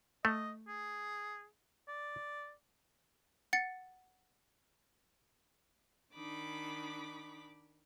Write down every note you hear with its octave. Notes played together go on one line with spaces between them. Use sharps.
A3 D#5
G#4
D5
F#5 A6 C#7
D#3 D4 D#4 B5 D6